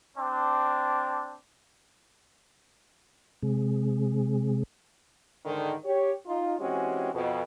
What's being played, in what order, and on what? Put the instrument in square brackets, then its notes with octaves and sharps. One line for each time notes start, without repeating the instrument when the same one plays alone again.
[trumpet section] C4 D4
[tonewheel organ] C3 G#3
[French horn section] G#2 D3 D#3
G4 C#5
D#4 F4
E3 G#3 C4 C#4 F#4 G4
F2 B2